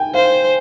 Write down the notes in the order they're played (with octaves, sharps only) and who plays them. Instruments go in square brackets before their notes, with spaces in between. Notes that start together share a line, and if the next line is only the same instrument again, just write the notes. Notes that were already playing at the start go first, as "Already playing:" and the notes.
Already playing: [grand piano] G5 G#5
[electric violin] C5 [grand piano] F5